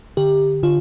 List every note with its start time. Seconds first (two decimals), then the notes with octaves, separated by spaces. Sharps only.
0.17 D3 G4
0.63 D3 F4